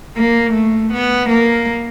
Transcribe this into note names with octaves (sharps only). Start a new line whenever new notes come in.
A#3
A3
B3
A#3